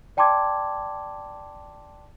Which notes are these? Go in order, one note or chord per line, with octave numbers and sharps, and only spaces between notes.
D5 G5 A5 C6 D6 G#6